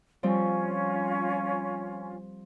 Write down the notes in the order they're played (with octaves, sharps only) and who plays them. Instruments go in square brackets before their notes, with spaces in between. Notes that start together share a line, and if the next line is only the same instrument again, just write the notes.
[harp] F3 G3 C4 [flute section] C#4 F4